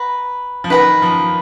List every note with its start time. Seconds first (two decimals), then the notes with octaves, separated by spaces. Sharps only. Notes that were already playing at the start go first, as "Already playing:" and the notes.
Already playing: B4 F#5 A#5
0.64 F3
0.70 D#3 B4 F#5 A#5
1.02 F3